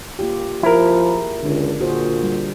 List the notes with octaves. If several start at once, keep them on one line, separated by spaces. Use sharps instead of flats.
A#3 F4 G4
F3 E4 A#4
G#4
C#2 D3 D4
A#2 F#4 G#4 C5
G3